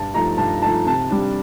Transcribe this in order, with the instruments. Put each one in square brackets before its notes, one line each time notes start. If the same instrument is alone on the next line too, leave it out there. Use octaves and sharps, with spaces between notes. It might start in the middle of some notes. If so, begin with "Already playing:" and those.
Already playing: [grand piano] G2 A5
F3 A3 D#4 A#5
G2 A5
F3 A3 D#4 A5
C3 A5
G3 D4